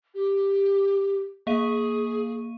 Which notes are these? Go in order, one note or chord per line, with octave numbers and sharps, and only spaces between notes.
G4
A#3 G#4 F5 D#7